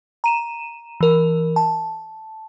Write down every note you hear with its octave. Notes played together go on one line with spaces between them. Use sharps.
A#5 D#7 E7
E3 A#4
A5